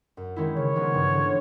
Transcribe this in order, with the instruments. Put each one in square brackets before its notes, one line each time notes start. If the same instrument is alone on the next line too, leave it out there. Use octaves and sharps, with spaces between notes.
[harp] F#2
D#3 G#3 C#4 E4
[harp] C#3 [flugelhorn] C#5
[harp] F3 G#3 B3 D#4
G2
D3 F3